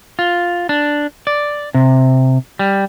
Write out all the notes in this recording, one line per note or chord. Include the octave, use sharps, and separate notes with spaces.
F4
D4
D5
C3
G3